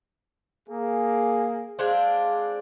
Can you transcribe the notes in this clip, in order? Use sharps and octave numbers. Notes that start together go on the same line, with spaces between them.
A#3 G#4
G#3 C4 D4 F5